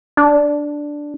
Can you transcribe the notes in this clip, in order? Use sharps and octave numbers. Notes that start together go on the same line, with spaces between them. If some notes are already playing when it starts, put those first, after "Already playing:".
D4